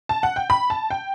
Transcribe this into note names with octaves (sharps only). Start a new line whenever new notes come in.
A5
F#5
G5
B5
A5
G5